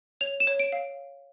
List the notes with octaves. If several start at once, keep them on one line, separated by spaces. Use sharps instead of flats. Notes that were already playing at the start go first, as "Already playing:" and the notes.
C#5 F7
E7
C#5
D7
F5